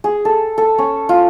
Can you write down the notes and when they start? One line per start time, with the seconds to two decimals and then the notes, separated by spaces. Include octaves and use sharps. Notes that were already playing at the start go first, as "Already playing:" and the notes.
0.04 G#4
0.25 A4
0.58 A4
0.78 C#4
1.09 F4